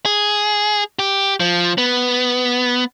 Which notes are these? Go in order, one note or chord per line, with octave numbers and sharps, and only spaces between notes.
G#4
G4
F3
B3